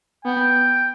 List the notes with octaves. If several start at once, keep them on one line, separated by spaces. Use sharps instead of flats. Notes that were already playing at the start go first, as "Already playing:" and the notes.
B3 G5